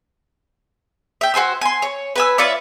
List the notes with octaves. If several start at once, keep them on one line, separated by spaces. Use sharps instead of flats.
E5 G5
F#4 C5 G#5 E6
G#5 C6
C#5
B4 G#5 E6
F4 C#5 D5 E5